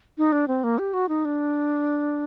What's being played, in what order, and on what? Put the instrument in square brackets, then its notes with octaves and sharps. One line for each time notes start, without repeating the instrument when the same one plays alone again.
[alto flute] D#4
D4
C4
A#3
G4
F#4
D#4
D4